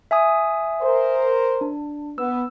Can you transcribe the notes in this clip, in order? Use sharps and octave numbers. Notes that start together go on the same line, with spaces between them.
E5 G#5 D#6
A#4 C5
D4
B3 E6